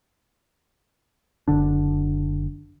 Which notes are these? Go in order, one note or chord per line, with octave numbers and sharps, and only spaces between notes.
F#1 D3 D4